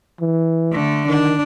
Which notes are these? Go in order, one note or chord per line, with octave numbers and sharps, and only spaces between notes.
E3
D3 A3
D#3 D4